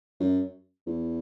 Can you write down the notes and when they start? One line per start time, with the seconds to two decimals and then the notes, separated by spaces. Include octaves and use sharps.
0.20 F#2
0.87 E2